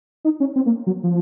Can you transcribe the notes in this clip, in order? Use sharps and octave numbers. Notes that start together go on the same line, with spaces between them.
D#4
C#4
C4
A#3
F#3
F3